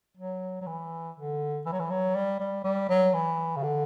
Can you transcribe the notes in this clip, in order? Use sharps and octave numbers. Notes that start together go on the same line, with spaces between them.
F#3
F#3
E3
D3
E3
F#3
E3
F#3
G3
G3
G3
F#3
E3
C#3
D3